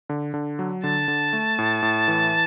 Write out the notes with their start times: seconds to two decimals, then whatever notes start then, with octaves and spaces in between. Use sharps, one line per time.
0.09 D3
0.34 D3
0.59 F#3
0.84 D3 A5
1.08 D3
1.33 A3
1.59 A2
1.83 A2
2.08 E3